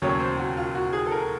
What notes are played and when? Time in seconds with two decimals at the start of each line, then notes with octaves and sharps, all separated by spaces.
0.02 E1 D#2 C#3 F#3 C#5
0.20 C5
0.39 F#4
0.57 F4
0.75 F#4
0.93 G#4
1.06 A4
1.11 A#4